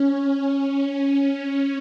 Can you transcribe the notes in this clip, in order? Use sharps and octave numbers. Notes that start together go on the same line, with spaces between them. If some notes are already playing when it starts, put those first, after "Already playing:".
Already playing: C#4